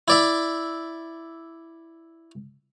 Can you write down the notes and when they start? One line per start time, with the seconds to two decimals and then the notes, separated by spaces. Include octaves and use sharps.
0.08 E4 D5 E5